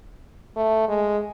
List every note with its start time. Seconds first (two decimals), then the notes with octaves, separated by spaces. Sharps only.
0.56 A3
0.88 G#3